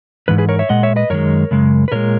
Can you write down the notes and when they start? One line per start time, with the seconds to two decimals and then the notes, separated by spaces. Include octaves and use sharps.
0.28 G#2 E3 B4
0.38 G#4 B4
0.49 A#4 C#5
0.59 C#5 E5
0.69 A#2 G#3 D#5 F#5
0.83 C#5 E5
0.96 B4 D#5
1.10 F#2 D#3 G#3 A#4 C#5
1.51 F#2 C#3 G#3
1.88 B4
1.92 A#2 G#3 A#4 C#5